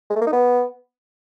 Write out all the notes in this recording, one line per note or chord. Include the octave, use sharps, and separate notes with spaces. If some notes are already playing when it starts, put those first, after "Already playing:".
G#3
A3
A#3
D#4
B3